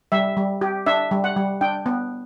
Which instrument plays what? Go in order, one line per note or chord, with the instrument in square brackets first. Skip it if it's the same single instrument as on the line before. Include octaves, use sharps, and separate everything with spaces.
[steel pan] G3 E5
G3
G4
D4 E5
G3
F#5
G3
D4 G5
B3